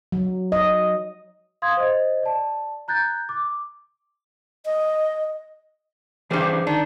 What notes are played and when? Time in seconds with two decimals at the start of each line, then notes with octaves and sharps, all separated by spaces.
0.12 F#3
0.52 D#5
1.62 F5 C6 D#6 G#6
1.77 C5 D#5
2.23 D5 A5
2.88 A#5 F#6 G6 A6
3.29 D6
4.65 D#5
6.31 G2 E3 G3 G#4 C5
6.67 D#3 D4